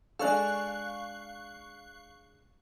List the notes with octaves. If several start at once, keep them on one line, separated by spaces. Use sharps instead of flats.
G#3 D4 A4 F5 C#6 F#6